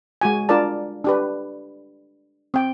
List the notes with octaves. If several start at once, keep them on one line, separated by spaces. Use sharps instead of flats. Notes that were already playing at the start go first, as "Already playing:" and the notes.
G#3 F#4 G#5
D4 F4 A#4 D5 A5
D4 G4 B4
C4 G5